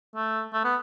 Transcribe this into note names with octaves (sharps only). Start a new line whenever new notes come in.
A3
A3
B3